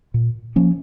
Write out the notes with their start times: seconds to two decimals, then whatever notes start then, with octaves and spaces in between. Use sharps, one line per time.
0.14 A#2
0.56 F3 A#3 C#4